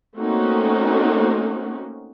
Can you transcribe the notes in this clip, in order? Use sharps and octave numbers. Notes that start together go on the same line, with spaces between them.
A3 A#3 C4 C#4 D#4 F#4